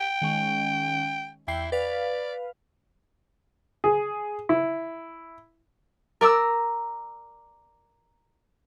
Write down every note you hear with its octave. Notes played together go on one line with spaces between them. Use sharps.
G5
D#3 G#3 C#4
E2 E4 G5 C7
B4 D5 F5
G#4
E4
A#4 D5 A#5 E6